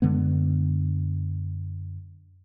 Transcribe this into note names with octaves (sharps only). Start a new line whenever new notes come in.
F#2 D3 G#3 B3